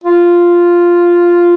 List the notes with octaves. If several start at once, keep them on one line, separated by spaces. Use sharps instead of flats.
F4